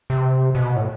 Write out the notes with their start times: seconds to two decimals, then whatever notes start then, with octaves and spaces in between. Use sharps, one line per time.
0.10 C3
0.55 B2
0.76 A2